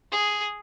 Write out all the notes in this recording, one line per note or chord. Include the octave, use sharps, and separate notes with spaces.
G#4